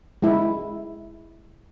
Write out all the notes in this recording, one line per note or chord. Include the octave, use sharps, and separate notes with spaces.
G#3 E4